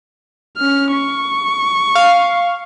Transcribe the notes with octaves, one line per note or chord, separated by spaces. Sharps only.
C#4 F6
C#6
F5